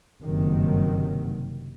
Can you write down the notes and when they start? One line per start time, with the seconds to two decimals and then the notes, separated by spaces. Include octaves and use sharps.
0.23 F#1 G2 C3 D#3 F#3